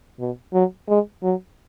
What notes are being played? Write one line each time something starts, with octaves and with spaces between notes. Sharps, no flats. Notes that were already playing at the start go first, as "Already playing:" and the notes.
B2
F#3
G#3
F#3